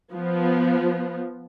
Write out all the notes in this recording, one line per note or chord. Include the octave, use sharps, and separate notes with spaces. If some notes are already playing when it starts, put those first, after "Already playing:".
F3 B3